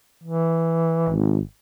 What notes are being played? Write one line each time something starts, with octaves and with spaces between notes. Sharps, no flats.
E3
G#1